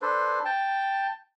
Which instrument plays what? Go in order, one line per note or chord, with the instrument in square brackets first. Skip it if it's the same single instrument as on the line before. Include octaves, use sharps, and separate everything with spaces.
[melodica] D4 A4 B4 C5
G5 A5